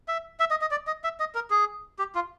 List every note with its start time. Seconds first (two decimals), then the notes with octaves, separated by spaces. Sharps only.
0.08 E5
0.40 E5
0.51 D#5
0.61 D#5
0.71 D5
0.87 D#5
1.04 E5
1.20 D#5
1.35 A#4
1.50 G#4
1.99 G4
2.15 F4